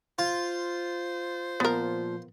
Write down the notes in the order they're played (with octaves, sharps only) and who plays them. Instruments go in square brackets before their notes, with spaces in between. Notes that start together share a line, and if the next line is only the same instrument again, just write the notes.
[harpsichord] F4 [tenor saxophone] C5
[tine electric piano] A#2 F3 [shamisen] B3 A#4